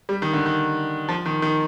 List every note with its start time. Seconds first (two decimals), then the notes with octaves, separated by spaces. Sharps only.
0.09 G3
0.22 D#3
0.33 D3
0.46 D#3
1.09 F3
1.26 D#3
1.42 D#3